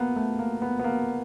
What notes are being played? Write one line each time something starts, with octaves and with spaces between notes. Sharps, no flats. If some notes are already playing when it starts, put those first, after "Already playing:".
Already playing: A#3 B3
A3
A#3
B3
B3
A#3